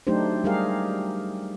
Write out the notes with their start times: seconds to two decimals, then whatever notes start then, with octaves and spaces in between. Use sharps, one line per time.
0.07 F#3 A3 D4 D#4 G4 C5
0.44 G3 G4 G#4 A#4 F5